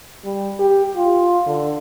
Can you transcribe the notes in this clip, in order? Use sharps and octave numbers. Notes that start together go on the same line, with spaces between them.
G3
G4
F4
D3